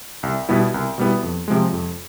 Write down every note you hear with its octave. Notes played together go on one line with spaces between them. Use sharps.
C2
B2 G3 B3 E4
C2
B2 G3 B3 E4
F2
C3 F3 G#3
F2